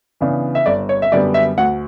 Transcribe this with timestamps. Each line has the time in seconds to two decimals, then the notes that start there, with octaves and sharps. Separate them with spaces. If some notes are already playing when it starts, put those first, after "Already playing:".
0.21 C#3 E3 B3 D4
0.55 E5
0.66 G1 D5
0.89 C#5
1.02 E5
1.12 F#2 D3 G3 B3 D5
1.34 E5
1.58 D2 F#5